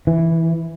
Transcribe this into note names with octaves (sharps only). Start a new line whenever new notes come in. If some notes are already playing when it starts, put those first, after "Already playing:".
E3